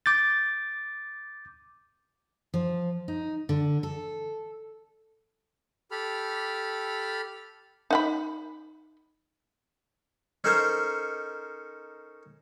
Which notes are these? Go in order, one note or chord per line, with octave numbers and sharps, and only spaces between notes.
D6 G6 A6
F3
D#4
D3
A4
G4 A4 B5 F6
D#4 F#5 B5
C#4 D#4 A4 A#4 C5 C#5